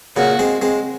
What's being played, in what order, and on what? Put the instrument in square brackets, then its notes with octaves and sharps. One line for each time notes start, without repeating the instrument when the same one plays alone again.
[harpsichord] A#2 C#3 [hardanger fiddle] F#4
[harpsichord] G#3 C4
G#3 C4